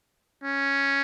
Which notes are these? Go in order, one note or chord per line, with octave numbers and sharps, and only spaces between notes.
C#4